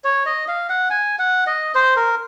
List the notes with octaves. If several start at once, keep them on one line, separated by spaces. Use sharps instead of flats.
C#5
D#5
F5
F#5
G#5
F#5
D#5
C5
A#4